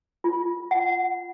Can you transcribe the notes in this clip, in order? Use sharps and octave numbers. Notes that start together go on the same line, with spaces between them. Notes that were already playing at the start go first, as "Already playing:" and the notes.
F4
F#5